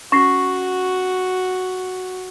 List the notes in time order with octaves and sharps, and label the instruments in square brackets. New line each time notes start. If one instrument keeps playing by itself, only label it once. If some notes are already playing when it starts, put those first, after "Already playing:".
[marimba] C#4 [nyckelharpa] F#4 [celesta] C#6 A#6 C7